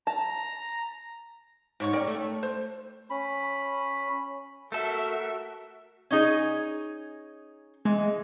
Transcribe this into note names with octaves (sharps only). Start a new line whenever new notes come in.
A5 A#5
G#2 C3 C#5 C#6
C#4 G4 A#4 D5
A3
C5
C#4 B5
A3 F#4 A4 A#4 E5
C#4 D#4 G#4
E3 G#3